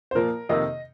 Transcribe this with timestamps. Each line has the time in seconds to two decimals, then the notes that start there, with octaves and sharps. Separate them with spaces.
0.11 C5
0.15 A#2 F3 A#3 A#4
0.49 F2 C3 D#3 A#3 D#5